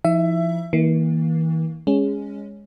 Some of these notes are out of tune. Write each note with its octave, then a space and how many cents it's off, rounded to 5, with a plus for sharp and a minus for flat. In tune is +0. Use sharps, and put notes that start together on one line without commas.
F3 -40 E4 -45 E5 +20
E3 -40 A#3 +0
G#3 -15 C#4 +5